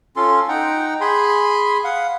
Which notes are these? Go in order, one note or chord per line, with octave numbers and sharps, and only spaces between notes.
C#4 F4 A4 C6
D#4 F#5 G5 A#5
G#4 G#5 B5 C6
F5 F#5